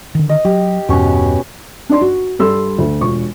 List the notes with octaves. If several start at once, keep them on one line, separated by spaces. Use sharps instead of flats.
D3 D#3
D#5
F#3 G4
E2 G2 B2 C#4 C#6
D4 D#4 D5 C6
F#4
G2 G3 A4 B5 C6 E6
D2
E1 F4 C#6